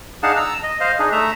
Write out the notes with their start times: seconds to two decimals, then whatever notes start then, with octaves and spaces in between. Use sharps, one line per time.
0.23 D4 D#4 G#4 F5 F#5 A5
0.37 A5 A#5 E6
0.63 D#5
0.80 C5 D#5 F5
0.99 D4 D#4 G#4
1.12 A3 E5 A#5